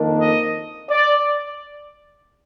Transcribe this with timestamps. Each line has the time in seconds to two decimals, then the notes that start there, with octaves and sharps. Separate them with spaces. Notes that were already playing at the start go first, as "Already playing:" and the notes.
Already playing: F2 D#3 A#3 D4
0.19 D#5
0.90 D5